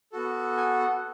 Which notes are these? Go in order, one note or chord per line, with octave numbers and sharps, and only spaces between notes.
B3 F#4 A4
G#5
F#5